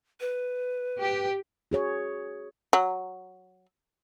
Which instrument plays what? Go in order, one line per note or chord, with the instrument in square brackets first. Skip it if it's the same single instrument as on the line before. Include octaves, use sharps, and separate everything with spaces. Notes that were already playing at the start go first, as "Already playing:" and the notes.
[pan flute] B4
[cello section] G4
[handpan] F#4 G#4 C#5
[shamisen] F#3